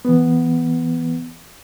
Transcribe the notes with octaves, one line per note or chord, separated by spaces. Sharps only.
E3 B3